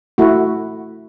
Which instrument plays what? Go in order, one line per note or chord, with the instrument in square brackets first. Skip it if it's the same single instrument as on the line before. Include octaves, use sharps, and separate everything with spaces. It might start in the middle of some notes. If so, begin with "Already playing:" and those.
[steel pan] A3 E4 F#4